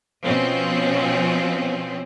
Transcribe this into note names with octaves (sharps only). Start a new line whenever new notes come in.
B2 F3 C4 C#4